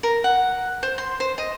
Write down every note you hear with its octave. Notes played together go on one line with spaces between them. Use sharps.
A#4
F#5
C5
C6
C5
D#5